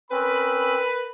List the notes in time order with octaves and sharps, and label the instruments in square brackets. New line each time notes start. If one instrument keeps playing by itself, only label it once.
[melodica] C4 C#4 [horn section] A#4 B5 [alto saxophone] B4